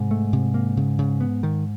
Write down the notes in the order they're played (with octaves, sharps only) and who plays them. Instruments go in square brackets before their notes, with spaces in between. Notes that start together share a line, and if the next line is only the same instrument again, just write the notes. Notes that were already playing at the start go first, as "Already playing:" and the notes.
Already playing: [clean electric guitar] G#2 [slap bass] C3
[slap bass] A3
C3
A#3
C#3
C#3
B3
D#3